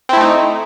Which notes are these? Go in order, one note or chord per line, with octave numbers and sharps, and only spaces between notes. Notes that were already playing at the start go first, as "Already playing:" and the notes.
A3 C4 D#4 E4